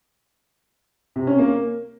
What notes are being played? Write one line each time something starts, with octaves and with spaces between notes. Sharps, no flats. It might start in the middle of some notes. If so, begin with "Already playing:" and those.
C3
C#4
A#3